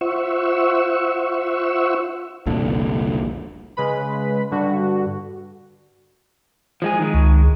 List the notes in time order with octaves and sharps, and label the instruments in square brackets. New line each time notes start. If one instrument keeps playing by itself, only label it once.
[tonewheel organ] F4 C5 E5 F#5 C#6 E6
[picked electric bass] F1 C2 A#2 D3
[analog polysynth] C#3 G#3 B4 B5
G2 D3 F#4
[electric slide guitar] F3 G#3 G#4
D#3 G#3
[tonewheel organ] C#2